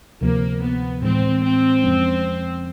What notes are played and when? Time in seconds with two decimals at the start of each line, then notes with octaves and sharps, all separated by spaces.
0.21 D2 C3 F3 A#3
0.62 B3
1.02 A2 E3 G#3 C4
1.43 C4
1.83 F2 C#3 F3 G#3 C#4